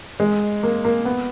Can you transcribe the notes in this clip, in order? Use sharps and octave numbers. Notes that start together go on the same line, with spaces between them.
G#3
A#3
A#3
B3